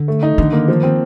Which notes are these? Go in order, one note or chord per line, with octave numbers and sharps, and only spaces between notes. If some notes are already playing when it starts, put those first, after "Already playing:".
Already playing: D3
A3
D#4
D3 D#3
A#3
F3
C4